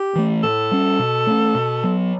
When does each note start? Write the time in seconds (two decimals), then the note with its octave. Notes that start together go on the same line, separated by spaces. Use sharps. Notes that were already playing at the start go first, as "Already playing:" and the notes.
Already playing: G4
0.15 E3 A3
0.43 A2 A4
0.71 G3 C#4
0.99 B2
1.27 A3 C#4
1.55 B2
1.84 F#3 B3